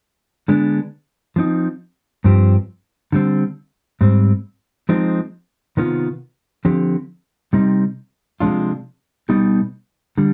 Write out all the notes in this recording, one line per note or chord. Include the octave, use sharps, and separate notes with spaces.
D3 G#3 B3 D4
F3 C4 D#4
G2 F3 C4 G4
D3 G3 C4
G#2 G3 C4
F3 G#3 C4 D#4
C3 D#3 B3 F4
D3 F3 C4 G4
C3 G3 C4 D#4
C3 F3 G#3 D4 F4
B2 G3 B3 D#4 G4
D3 G3